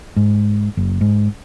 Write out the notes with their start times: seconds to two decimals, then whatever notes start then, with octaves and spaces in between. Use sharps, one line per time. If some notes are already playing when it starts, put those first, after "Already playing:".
0.16 G#2
0.77 F#1
1.01 G#2